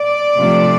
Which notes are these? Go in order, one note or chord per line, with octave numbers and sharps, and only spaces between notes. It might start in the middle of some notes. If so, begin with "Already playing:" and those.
Already playing: D5
C3 F3 A3 D4